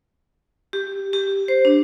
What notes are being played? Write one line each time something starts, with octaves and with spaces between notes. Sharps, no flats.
G4
G4
C5
D4